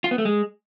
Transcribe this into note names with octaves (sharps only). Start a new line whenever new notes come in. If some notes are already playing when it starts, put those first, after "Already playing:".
F4
B3
A3
G#3